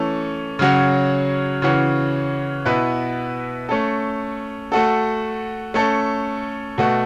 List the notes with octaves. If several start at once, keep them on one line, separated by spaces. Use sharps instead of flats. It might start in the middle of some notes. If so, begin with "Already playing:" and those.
Already playing: E3 A3 C#4 A4
C#3 F#3 C#4 F#4
C#3 E3 C#4 F#4
B2 B3 E4 B4
A3 C#4 A4
A3 F#4 A4
A3 C#4 A4
B2 A3 F#4